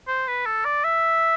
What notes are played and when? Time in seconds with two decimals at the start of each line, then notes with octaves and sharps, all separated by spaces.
0.08 C5
0.27 B4
0.46 A4
0.65 D5
0.84 E5